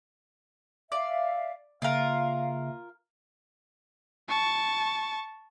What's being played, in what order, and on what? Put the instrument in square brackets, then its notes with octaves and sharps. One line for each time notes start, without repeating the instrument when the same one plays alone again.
[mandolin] D5 [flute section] E5 F5
[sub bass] C#3 [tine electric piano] A#3 E5 [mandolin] F4 A#4 [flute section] F5
[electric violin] A5 C#6